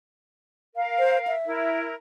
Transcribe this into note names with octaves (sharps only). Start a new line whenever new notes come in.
A#4 F5
C5
E5
E4 A#4